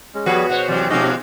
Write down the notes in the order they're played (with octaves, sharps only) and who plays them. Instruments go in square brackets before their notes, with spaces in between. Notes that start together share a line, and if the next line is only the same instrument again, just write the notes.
[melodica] G#3 C#4
[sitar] F3 G#4 B4 [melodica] G3 B3 C#5 [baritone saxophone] F#4
[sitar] B2 C5 C#5 [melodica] F#5
[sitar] E2 C3 F#3 [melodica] C#4 C5 D5
[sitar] B2 F3 G#3 [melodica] C#4 F#4 G4 [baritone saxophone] D#4